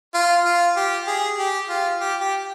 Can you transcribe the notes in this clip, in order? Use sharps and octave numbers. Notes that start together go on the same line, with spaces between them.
F4
F4
G4
G#4
G4
F4
G4
G4